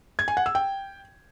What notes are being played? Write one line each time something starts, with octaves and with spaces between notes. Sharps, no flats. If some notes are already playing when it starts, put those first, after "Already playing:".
G#6
G#5
F#5
E6
G5